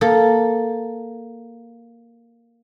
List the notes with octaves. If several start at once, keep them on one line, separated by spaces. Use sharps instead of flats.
A#3 A4